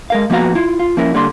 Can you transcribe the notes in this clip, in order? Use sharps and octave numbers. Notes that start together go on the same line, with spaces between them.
G#3 A#4 F5
F3 A#3 B3 F#4 F5 A#5
E4 F4
F4
F3 A#3 C#4 E4 A#4
D3 G3 A#3 D4 C6